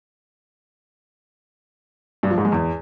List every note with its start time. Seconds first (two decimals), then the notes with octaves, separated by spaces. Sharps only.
2.23 G2
2.30 F3
2.38 G#2
2.45 G#3
2.52 E2